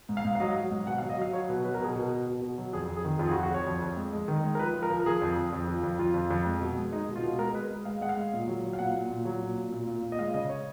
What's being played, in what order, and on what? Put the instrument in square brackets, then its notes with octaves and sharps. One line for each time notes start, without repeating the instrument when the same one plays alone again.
[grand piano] G#2
F5
G#2
F5
F#3 D#5
F#3
G#2
B2 F#5
F5
F#3
D#5
F#3 F5
F#3 C#5
B2 B4
F#3 B4
A#4
B2 G#4
B2 A#4
B2
B2
B2
F#3
F2 G#4
F2
G#4
D#3
F2 F4
G#4
F#4
F2
F#4
F2 C#5
F2
F2
G#3
G#3
D#3
G#3
A#4
F3 B4
F3
A#4
F3
A#4
F3 G#4
F2
F2
F2
F3
F2
F2 F4
F2
F2
G#3
B2
G#3
G#3 D#4
B2
F4
B2
G#3 A#4
G#3 B4
G#3
G#3 F5
G#3 F#5
F5
G#3
A#2
F#3
F#3
F5
A#2 F#5
A#2
A#2
F#3
A#2
A#2
A#2
A#2
A#2
D#5
G#3 F5
C#3 D#5
C#5